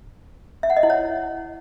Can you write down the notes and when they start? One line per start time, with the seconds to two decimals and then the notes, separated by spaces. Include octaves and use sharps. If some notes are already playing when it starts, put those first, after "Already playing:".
0.63 E5
0.70 F#5
0.77 D#5
0.83 E4
0.90 C#5